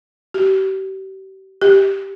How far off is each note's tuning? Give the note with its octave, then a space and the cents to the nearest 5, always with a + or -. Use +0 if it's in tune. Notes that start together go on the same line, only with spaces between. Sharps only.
G4 -35
G4 -5